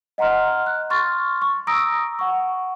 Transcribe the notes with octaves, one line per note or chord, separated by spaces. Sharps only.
D#5 F#5 A#5 C6 F6
F#6
C6 C#6 F6 A6
C#6
A#5 D#6 E6 A#6 D7
F#5 C#6